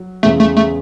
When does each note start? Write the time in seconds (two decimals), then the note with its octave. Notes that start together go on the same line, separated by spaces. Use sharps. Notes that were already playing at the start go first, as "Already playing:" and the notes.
Already playing: F#3
0.23 E2 C#3 G#3 A3
0.40 A3
0.57 A3